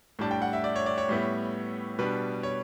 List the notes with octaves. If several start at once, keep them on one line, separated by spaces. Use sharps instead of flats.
A2 G3 D4 A5
G5
F#5
E5
D5
C#5
D5
C#5
A2 G3 B3 E4
B2 G3 D4 B4
C#5